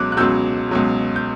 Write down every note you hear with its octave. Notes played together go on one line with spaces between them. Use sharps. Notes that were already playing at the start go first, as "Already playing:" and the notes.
Already playing: C#2 B2 F#3 D6 F#6
F#6
C#2 B2 F#3 E6 G6
C#2 B2 F#3
G6